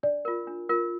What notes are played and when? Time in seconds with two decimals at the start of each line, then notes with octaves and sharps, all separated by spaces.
0.03 D4 D5
0.25 F4 A#4
0.47 D4
0.69 F4 A#4